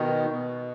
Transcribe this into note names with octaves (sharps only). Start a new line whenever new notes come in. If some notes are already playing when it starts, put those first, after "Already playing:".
Already playing: B2 D#3
B2